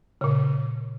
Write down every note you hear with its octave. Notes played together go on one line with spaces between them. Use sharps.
A#2 C#3